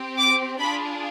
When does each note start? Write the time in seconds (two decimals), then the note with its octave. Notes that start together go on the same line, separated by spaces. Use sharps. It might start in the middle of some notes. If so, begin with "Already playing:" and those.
Already playing: C4 G4
0.18 D6
0.59 D4 F4 G#4 B5